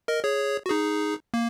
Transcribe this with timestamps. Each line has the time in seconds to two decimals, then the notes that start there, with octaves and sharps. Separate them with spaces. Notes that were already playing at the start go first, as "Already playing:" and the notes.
0.08 A#4 D#5
0.24 G#4 C#5
0.66 F#4
0.70 D#4 G#4
1.34 A#3